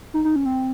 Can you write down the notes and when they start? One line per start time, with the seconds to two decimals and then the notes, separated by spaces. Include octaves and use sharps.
0.14 D#4
0.25 D#4
0.36 C#4
0.45 C4